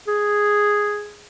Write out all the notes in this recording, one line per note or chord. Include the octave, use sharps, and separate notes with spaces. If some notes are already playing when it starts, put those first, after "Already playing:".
G#4